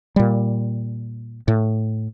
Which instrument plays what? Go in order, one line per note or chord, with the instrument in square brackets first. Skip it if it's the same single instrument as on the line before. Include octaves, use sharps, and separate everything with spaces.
[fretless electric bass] A#2 G3
A2